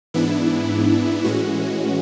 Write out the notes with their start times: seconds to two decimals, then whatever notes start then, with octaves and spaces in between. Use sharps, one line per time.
0.14 G#2 E3 B3 D4 E4
1.24 A2 E3 G#3 C#4 F#4